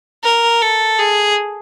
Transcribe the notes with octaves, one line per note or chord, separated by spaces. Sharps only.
A#4
A4
G#4